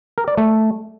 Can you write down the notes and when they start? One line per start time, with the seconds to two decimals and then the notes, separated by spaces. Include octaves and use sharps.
0.18 A#4
0.28 D5
0.38 A3